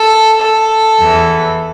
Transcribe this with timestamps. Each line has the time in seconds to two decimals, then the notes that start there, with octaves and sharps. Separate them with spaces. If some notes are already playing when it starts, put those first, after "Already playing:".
Already playing: A4
0.41 A4
0.98 E2 E3